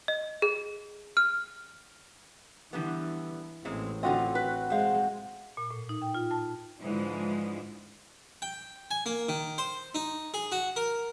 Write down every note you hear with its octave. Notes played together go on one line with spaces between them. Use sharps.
D#5
G#4
F6
D3 E3 G3 B3
A1 A#2 G#3 C4
D3 C4 F4 F#4 D#5
B4
G#3 C5 F5
A#2
A2
D#4
G5
F4
A5
G#2 D3 E3 F3 G#3
G5
G#5
A#3
D#3
C5
D#4
G#4
F#4
A#4